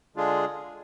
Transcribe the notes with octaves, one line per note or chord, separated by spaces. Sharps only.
D3 G#3 D4 F4 G#4